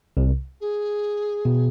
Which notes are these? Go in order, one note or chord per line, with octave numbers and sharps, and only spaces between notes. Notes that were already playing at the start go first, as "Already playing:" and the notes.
C2 C3
G#4
B2